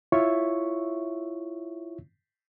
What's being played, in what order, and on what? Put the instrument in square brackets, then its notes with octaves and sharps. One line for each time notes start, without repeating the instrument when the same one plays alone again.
[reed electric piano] E4 F4 C#5 E5 C#6